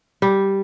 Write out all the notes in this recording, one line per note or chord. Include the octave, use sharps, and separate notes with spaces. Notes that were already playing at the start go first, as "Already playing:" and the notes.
G3